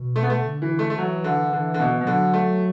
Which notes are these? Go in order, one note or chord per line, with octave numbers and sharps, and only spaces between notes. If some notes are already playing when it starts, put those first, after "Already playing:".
Already playing: B2
A3
B3
A3
D3
E3
A3
A3
E3 F#3
D3
D3 E3
D3
B2
B2
D3 F#3
A3